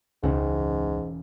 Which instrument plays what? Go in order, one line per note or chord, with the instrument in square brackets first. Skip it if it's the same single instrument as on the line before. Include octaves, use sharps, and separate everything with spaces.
[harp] E1 C#3 D#4 [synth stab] C#2 [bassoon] G#2